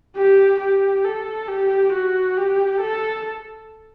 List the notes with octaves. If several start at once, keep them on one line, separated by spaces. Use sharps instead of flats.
G4
G4
A4
G4
F#4
G4
A4